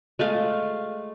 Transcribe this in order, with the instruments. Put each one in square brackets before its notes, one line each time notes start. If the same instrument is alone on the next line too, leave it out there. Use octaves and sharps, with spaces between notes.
[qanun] G#3 A3 F5